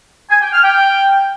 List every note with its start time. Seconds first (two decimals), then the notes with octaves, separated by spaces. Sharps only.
0.31 G#5
0.42 G5
0.53 F6
0.63 G5